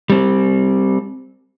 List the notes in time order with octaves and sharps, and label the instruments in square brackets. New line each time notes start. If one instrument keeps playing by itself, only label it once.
[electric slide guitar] G3 C4